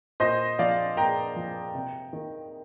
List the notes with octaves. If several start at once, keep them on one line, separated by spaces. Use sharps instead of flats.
A#2 C5 D#5
F3 D5 F5
A#2 G5 A#5
F3
C3
D#3